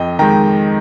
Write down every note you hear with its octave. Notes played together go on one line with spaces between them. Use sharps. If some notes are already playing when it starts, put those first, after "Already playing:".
Already playing: F2 D#5 G5
D#3 G#3 G5 A#5